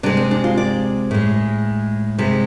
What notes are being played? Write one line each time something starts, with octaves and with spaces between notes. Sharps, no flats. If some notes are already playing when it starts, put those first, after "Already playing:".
C3 G#3 D4
C4
D4
F4
D5
A2 G#3
C3 G#3